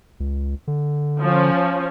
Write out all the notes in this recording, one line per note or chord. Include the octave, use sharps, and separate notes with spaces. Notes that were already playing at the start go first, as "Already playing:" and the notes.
C#2
D3
F3 C#4